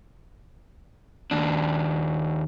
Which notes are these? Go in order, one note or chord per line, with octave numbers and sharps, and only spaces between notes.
D#2 D4